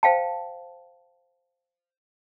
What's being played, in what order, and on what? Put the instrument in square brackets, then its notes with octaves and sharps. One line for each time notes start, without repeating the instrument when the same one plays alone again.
[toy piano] C5 F5 G5 A5